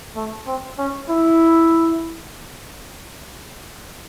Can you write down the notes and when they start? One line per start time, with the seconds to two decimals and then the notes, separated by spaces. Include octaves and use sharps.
0.15 A3
0.47 C4
0.78 C#4
1.09 E4